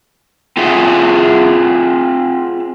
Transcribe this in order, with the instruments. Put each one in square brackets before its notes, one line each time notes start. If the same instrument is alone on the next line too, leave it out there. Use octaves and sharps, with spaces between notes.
[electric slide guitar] C4 F4 G#4 E5 F#5